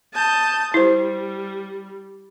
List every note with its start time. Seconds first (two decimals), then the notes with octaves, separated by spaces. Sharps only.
0.14 A5 D#6 G6
0.74 G3 E4 C5